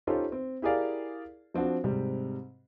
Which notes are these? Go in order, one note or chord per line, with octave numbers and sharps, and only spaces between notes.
C#4 D#4 F4 G4 A4 C5
C4
E4 G4 G#4 A#4 D5 F5
F3 C4 D4 F#4
G#2 C3 G3 C4